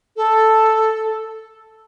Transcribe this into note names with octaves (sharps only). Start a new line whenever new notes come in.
A4